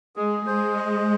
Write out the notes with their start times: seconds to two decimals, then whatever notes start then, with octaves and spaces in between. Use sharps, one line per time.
0.16 G#3 G#4
0.46 G#3 C5
0.76 D#5